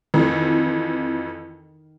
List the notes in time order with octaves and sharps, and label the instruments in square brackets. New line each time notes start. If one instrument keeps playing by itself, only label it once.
[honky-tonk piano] F2 E3 [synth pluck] D#3